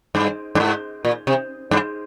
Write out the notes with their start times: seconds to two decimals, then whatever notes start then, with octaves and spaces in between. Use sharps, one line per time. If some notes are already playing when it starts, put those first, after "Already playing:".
0.15 G2
0.55 G2
0.60 G#2
1.05 A#2
1.27 C3
1.71 G2